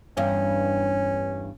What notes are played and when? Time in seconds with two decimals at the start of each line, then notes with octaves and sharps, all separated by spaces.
0.17 E2 G2 C#4